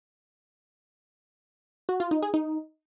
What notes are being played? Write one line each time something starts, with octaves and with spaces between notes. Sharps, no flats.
F#4
F4
D#4
G#4
D#4